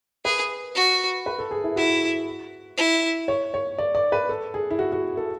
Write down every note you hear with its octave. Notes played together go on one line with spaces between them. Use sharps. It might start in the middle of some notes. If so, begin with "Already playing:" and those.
G#4 B4
F#4
B4
A4
G#4
E4
E4 F#4
E4
C#5
C#5
D5
D5
B4
A4
G#4
E4
F#4
F#4
A4